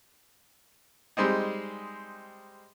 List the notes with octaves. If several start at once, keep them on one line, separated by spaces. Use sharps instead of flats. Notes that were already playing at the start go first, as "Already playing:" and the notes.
G3 G#3 C4 D#4